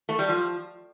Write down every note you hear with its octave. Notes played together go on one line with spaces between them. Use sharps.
A3
G3
F3